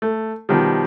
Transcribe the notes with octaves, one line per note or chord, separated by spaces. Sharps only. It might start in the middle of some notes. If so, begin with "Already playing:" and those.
A3
B2 D#3 F3 G3